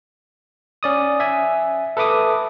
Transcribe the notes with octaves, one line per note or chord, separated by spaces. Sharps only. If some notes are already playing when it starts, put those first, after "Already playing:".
C#4 D5 D#6
E5 G#5
A4 B4 E5 D6 D#6